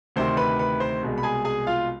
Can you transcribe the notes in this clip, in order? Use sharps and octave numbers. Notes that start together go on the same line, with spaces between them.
D2 C3 D#3 C5 C6
B4 B5
B4 B5
C5 C6
C2 B2 G#3
B5
G#4 G#5
G#4 G#5
F4 F5